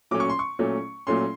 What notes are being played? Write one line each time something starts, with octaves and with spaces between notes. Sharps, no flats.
A#2 F#3 A3 C#4 D6
C#6
C6
C#6
A#2 F#3 A3 C#4
A#2 F#3 A3 C#4 C6